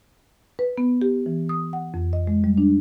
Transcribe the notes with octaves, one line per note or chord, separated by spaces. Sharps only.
B4
B3
G4
E3
D#6
F#5
F2
D#5
G#3
G3
D4